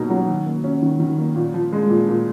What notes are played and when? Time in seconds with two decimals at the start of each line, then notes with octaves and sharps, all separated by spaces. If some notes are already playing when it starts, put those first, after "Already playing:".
Already playing: B2 F#3 A#3 D#4
0.10 F#3
0.27 D#3
0.46 A#3
0.64 C#4
0.82 D#3
1.00 D#3
1.18 A#3
1.36 A#2
1.54 F3
1.73 G#3
1.90 A#2
2.09 A#2